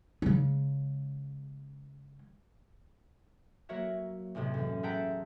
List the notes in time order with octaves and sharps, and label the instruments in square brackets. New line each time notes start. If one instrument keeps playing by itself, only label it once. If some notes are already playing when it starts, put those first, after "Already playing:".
[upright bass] C#3 G#3
[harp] F#3 A#3 F#4 A#4 C#5 E5
B1 E2 A2 C3 G#3
F#2 E3
G#4 E5 F#5 G5 A5 A#5